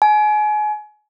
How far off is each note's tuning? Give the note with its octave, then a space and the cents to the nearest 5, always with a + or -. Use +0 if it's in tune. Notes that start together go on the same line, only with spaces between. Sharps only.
G#5 +30